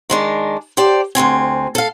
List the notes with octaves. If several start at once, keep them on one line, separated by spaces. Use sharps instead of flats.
D#3 G#3 D4
G4 C5 D5 A5
D2 G#2 C4 G#5
A4 F5